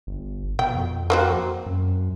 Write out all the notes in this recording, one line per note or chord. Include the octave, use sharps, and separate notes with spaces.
G1
B2 G5
F2
A#3 C4 F#4
F#2